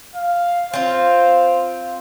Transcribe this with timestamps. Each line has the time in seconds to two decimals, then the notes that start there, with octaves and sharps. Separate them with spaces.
0.15 F5
0.73 C4 F4 C5